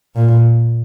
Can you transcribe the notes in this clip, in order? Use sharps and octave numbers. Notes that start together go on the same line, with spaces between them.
A#2